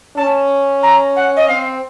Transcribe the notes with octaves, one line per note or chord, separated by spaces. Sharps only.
C#4 A5
A#5
F#5
D#5
C4 F5